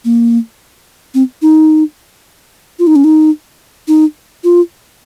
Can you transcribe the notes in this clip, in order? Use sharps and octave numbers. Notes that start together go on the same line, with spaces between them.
A#3
C4
D#4
F4
D#4
C#4
D#4
D#4
F4